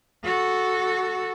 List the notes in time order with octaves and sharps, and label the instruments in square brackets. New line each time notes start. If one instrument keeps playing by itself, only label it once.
[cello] F#4 A4